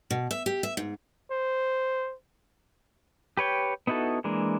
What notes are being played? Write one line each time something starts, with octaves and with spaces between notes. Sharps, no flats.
B2
E5
G4
E5
G#2
C5
G4 B4 C#5 G5
B3 D#4 E4 F#4 A4
E3 G#3 A#3 D4